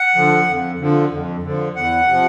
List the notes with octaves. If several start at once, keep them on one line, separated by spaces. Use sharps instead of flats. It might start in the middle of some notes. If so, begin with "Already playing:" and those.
Already playing: F#5
D3 F3
F2
D3 F3
F2
D3 F3
E2 F#5
C3 F3